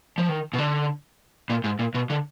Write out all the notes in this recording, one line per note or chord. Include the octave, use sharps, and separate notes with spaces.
F3
D#3
B2
D3
A#2
G#2
A#2
B2
D3